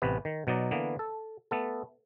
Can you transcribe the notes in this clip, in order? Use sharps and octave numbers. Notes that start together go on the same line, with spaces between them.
A1 C3 B3 B4
D#3
B2 F#3 D#4 D5
D3 E3 A#3 B3
A4
A3 B3 A4